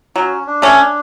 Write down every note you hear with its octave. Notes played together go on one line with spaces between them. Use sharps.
F#3 C#4
D4
A3 C#4
D4